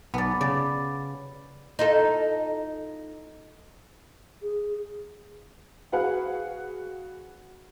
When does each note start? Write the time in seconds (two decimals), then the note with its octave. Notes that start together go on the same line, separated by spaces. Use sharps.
0.14 B1 B3 D5
0.41 C#3 D5
1.79 D#4 F4 A4
4.42 G#4
5.92 F#4 G#4 B4 F5 F#5